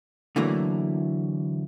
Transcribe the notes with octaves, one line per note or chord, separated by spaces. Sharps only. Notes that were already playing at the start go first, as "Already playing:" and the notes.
D3 E3 F#3 A3 A#3